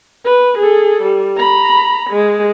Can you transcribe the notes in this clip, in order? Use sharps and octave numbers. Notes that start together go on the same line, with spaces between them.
B4
G#4 A4
G3
A#5 B5
G#3